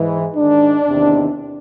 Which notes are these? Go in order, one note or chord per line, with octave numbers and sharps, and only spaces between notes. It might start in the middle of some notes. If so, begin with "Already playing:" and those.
Already playing: G#2 E3
G#2 D#3 D4
E2 C3 D#3